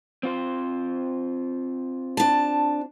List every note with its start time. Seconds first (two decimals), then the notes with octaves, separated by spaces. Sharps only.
0.23 C4 F4 C5
2.17 D4 A5